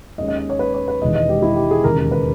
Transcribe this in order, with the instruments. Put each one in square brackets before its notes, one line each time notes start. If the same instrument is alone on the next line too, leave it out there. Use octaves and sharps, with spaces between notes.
[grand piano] D#2 D#3 G#3 C#4 D#5
D#5
D#5
C#5
B4
C#5
B4
E1 E2 D#3 G#3 D#5
D#5
G4
E4
G4
G#4
E1 D#2 C#3 G#3 A#4
A#4
B4